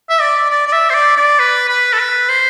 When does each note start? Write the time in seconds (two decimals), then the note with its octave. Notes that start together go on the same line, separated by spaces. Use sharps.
0.10 E5
0.21 D5
0.50 D5
0.67 D5
0.72 E5
0.90 C5
0.94 D5
1.17 D5
1.39 B4
1.69 B4
1.93 A4
1.99 B4
2.29 C5